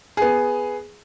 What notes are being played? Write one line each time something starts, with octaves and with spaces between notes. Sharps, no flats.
B3 G#4